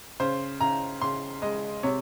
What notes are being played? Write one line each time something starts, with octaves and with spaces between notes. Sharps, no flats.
C#3 C5
C#3 A#5
C#3 C6
G#3 D#5
C3 C#5